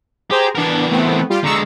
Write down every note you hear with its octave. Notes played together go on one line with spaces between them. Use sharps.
G4 G#4 C5 A#5
E3 B3 D4 A#4
A3 B3 C4
G3 F4 G4
D3 G#3 A#5 C#6 E6